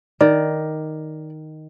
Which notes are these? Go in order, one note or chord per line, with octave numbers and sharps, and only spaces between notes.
D#3 D5